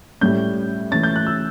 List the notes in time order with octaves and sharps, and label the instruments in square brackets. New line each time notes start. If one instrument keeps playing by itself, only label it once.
[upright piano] A2 G3 C#4 G6
E3 A3 C#4 A6
G6
F#6
E6